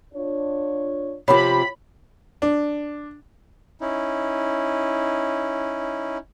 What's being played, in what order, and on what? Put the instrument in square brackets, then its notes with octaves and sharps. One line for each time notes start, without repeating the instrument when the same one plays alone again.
[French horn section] D4 F4 C#5
[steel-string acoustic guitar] C3 F3 G4 [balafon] C#5 [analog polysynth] B5
[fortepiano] D4
[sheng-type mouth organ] C#4 D#4 E4